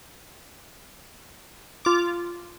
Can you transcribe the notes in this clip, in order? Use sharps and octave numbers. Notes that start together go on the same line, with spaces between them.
F4 D6